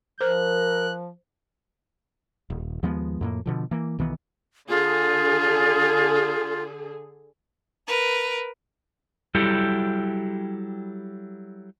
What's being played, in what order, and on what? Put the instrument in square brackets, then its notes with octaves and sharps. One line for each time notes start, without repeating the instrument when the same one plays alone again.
[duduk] F3 [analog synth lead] A#4 [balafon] C5 [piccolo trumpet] F#6
[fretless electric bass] D#1
D#2 F3 G#3 B3
F2 A2 A#3
B2 D3 F3
E3 A#3
B1 D#3 E3 B3
[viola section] D3 G#4 A4 [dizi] F4
[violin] A#4 B4
[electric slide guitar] F#3 G3 E4 G4 A4